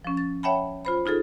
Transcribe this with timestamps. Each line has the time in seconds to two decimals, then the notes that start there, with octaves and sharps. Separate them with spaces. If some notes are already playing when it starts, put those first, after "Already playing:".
0.04 F3 C#4
0.17 A6
0.43 C#5 E5 F#5 G5 A5 B5
0.85 F4 C5 B5
1.06 D#4 F4 G#4 A4